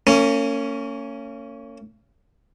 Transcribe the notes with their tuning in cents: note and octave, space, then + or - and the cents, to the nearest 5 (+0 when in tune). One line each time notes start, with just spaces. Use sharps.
A#3 -40 C#4 +0